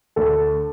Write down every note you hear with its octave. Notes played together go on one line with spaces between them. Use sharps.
D2 A4